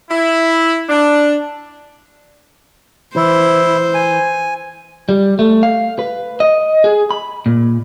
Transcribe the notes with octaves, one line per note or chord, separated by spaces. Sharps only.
E4
D4
E3 E4 C5
G#5
G3
A3
F5
B4
D#5
G#4
B5
A#2